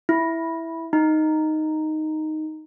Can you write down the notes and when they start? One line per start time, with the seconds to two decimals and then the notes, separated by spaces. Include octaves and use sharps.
0.09 E4
0.93 D#4